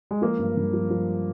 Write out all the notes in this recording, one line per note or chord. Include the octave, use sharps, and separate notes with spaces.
G#3
F3 A#3
G2
G2
F3
F3